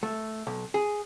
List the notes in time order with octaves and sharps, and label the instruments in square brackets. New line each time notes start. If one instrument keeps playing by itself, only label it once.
[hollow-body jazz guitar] A3
B1
G#4